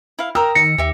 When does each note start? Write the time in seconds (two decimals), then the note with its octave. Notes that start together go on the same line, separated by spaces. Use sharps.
0.19 E4 F5
0.35 A#4 G5 A#5 D#6 E6
0.55 D#3 A#6 C#7
0.78 D#2 G4 E5